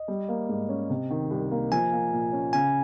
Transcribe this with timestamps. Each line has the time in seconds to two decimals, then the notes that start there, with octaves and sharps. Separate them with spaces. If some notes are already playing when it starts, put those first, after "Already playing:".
Already playing: D#5
0.08 G3
0.29 A#3
0.49 G#2
0.69 C#4
0.90 C3
1.10 D#3
1.30 C2
1.51 A#3
1.72 F3 G#5
1.93 A#3
2.12 A#2
2.33 C#4
2.53 C#3 G#5